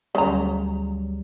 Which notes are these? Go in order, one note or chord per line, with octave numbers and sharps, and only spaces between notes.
D2 C#3 F#3 G3 A#5